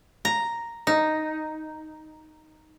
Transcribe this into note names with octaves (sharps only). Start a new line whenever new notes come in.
A#5
D#4